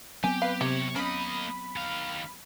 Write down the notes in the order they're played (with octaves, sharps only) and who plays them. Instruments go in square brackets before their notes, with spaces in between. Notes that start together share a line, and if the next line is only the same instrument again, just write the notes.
[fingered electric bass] F#3 B3 C4 [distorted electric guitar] G4 [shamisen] G#5
[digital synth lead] B4 [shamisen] F5
[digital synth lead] C3 [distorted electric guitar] E4 C#5 [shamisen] G4
[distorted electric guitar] A#3 D#5 [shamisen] C#4 [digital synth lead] B5
[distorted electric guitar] D#3 F5